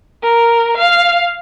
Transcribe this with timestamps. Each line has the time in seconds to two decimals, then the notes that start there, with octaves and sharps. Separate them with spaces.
0.23 A#4
0.77 F5